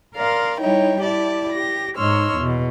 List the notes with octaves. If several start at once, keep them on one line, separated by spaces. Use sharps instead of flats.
A#4 D5 F5 C6
G3 D#4 E4 C#5 G5
E4 G4 D5 A5
G4 A#6
G#2 D#4 C#5 C6 E6 F6
E2 B2